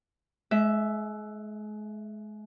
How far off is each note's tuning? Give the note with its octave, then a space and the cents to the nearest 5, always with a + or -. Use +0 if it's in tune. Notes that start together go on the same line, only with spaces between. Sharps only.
G#3 +35 E5 +5